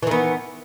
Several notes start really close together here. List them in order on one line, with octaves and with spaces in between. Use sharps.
E3 D#3 B3